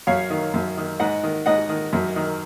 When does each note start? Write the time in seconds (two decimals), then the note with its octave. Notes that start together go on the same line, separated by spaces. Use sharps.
0.07 F#2 C#5 F5
0.30 D#3
0.54 F#2
0.77 D#3
1.00 G#2 D#5 F#5
1.23 D#3
1.46 G#2 D#5 F#5
1.69 D#3
1.93 F#2
2.16 D#3